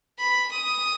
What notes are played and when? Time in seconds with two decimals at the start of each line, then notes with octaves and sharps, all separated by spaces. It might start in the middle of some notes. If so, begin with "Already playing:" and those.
0.18 B5
0.51 D#6